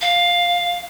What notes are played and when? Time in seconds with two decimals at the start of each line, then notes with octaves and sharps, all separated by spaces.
0.01 F5